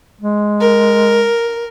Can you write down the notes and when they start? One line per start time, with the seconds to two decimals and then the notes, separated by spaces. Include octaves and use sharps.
0.21 G#3
0.61 A#4